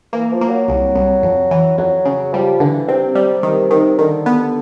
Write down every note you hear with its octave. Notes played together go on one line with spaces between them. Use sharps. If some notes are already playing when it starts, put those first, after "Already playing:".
E3 A#3
F3
A#3
F#3
C2
C2
F2
E3
F2 F#3
C#3
F3 G3
D3 E3
C3 C4
G3
D#3
D#3
D3 D#3
B3